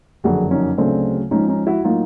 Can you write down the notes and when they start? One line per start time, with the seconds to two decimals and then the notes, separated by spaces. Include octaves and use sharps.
0.24 F#1 F2 D3 F#3 F#4 G#4
0.51 C#4 D#4
0.77 D2 C#3 F#3 A3 C4 D4
1.31 G#1 G#2 F3 C#4 D#4
1.49 C#4 D#4
1.67 E4 F#4
1.84 A2 F#3 A#3 D#4 F4